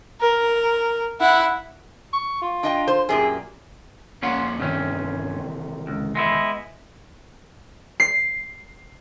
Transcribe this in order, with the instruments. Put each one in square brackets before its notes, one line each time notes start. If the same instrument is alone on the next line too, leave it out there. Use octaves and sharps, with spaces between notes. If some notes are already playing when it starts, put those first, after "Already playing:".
[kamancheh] A#4
E4 F#5
[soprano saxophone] C#6
F4
[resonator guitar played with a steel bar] D4 D#5 G5
C5
[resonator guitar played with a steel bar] F#2 A#2 G4 [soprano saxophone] G#4
[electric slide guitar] F2 A#3 F#5 [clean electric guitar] C#4 F4
[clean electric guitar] G2 C#4 [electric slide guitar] C3 D#3 E3
[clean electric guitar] C#2
G#3 B3 E4
[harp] C7